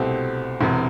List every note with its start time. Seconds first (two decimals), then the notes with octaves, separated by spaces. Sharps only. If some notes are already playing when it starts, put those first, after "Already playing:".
Already playing: C2 B2 A3 C4 G4
0.61 E1 E2 C3